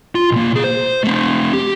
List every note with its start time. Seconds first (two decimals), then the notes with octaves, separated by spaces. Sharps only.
0.15 F4
0.31 B1 A#3
0.51 B2 G#4
0.64 C5
1.04 A3 C4
1.53 G4